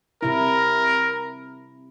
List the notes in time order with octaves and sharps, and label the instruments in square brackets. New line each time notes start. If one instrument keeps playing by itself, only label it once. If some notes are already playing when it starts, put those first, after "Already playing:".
[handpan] C3 E4 [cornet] A#4